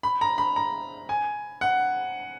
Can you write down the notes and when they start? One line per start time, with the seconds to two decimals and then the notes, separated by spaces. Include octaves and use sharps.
0.03 B5
0.21 A#5
0.38 B5
0.56 A#5
1.09 G#5
1.61 F#5